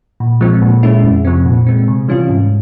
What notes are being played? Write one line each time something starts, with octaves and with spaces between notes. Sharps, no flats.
A#2
F3 G#3 C4
A#2
G#3 C#4 E4
F2
C3 F3 C4
A#2
G#3 C4
C3
E3 G3 C#4 F4
G#2